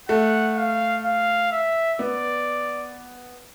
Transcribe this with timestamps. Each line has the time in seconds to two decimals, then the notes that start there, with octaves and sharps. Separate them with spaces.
0.09 A3 F#5
0.56 F5
1.05 F5
1.51 E5
1.99 B3 D5